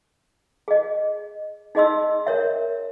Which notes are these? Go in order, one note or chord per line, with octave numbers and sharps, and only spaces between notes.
G#4 D#5
D#4 G#4 D#5 C6 E6
A#4 C#5 E5